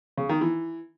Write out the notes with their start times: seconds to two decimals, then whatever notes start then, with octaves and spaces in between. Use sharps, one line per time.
0.18 C#3
0.29 D#3
0.41 E3